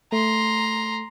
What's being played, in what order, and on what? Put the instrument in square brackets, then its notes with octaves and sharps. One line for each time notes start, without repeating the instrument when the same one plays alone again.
[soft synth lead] A3 [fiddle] A#5 C6